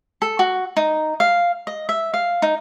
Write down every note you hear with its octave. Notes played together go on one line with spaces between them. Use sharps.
A4
F#4
D#4
F5
D#5
E5
F5
D#4